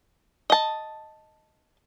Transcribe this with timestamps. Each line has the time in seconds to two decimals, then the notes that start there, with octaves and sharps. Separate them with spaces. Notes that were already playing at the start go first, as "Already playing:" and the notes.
0.50 D#5 A5